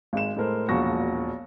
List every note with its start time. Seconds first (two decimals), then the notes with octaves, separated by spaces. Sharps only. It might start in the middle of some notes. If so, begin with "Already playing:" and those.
0.13 G#1 G#3 E7
0.36 A2 G#3 A4 A#4 C5
0.68 E1 A#1 F3 F#4 C#6 A#6